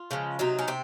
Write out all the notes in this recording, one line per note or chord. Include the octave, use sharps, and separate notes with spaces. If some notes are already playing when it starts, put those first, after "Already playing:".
Already playing: F4
C#3 F3 G#3
C3 F#3 D#4
C#4
C3 C4